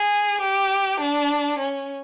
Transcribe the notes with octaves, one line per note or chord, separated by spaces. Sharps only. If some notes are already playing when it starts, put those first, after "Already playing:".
Already playing: G#4
G4
D4
C#4